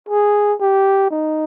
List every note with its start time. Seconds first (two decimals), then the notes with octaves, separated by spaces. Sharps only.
0.09 G#4
0.60 G4
1.11 D#4